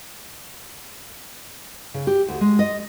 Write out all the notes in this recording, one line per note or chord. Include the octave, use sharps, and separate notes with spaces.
C#3
G4
D2
G#3
D#5